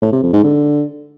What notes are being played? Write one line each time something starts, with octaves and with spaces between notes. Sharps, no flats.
A2
C3
F2
G#2
D3